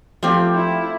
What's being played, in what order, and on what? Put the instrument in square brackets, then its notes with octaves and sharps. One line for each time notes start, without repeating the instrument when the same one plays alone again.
[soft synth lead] F3 [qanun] A3 C4 [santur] F4 G4
[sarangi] E4